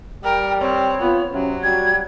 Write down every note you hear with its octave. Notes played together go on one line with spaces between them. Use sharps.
G3 A#4 G5
C4 C#5
B3 F4
C3 F#3 C#4
G3 F#4 G#6